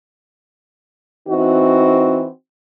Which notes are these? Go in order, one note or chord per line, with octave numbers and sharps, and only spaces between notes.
E3 C4 D#4 F#4